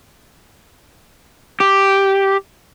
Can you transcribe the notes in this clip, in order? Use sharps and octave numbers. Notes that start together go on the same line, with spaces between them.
G4